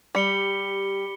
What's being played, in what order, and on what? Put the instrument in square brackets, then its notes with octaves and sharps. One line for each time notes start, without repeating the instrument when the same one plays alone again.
[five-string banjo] G3 [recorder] G4 [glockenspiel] B5 C#7 G7